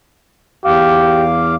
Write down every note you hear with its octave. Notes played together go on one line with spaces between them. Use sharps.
E2 G4 F5 D6